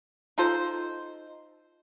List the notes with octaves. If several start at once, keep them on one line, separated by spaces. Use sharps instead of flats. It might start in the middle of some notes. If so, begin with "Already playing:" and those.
D#4 F4 A4 C5